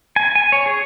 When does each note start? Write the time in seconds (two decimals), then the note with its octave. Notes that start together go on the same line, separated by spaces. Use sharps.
0.16 G#5
0.35 G#5
0.52 C#5
0.66 G#4